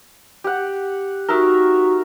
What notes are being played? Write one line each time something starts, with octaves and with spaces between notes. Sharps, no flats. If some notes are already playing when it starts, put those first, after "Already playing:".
G4 F#5
D#4 F#4 A#4 E5 C#6